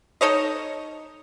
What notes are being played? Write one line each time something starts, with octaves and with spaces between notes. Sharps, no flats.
D#4 A4 C#5 D#5